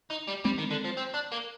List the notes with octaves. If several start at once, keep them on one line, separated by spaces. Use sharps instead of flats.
D#4
G3
G3 G#3 C4
D#3
D3
F3
C4
D4
A#3